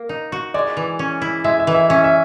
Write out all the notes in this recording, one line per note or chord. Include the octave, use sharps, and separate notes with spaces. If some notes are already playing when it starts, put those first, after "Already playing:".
Already playing: A#3
D#4
F#4
G#3 D5
E3
C#4
E4
G#3 E5
E5
E3
E5
C#4 E5
E5